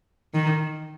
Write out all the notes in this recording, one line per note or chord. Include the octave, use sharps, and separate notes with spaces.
D#3